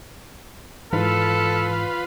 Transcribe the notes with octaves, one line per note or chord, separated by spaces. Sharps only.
G#2 E3 F4 A4 B4